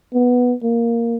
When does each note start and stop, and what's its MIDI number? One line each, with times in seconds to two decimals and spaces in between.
0.14 0.54 59
0.63 1.17 58